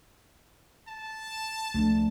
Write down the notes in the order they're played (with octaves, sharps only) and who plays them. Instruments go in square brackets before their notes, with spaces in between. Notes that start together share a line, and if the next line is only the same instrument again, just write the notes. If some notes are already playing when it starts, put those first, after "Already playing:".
[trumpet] A5
[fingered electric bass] C#2 D3 F3 [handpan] A3 D4